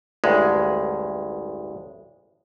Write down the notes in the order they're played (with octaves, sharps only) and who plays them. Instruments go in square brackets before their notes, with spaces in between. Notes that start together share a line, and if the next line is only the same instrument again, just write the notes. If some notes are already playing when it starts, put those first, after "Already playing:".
[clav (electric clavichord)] A1 D2 G2 G#3